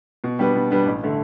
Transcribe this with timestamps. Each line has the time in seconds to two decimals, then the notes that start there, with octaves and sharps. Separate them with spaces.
0.24 B2
0.39 G3 B3 D4 B4
0.55 B2
0.71 G3 B3 D4 B4
0.86 A1
1.03 D3 A3